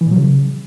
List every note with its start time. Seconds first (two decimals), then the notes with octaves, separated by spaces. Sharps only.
0.01 E3
0.06 A#2
0.11 F#3
0.17 C#3